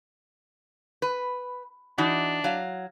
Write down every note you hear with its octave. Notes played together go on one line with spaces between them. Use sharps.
B4
E3 D4 D#4 F#4
F#3 F5